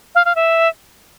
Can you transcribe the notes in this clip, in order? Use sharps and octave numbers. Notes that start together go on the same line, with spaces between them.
F5
F5
E5